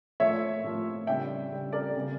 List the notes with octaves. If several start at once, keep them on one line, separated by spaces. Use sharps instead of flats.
A2 F3 A#3 C#5 E5
A2 F3 A#3
C#3 G3 D4 E5 G5
C#3 G3 D4
A#4 D5
C#3 G3 A#3